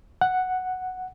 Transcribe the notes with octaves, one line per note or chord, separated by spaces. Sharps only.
F#5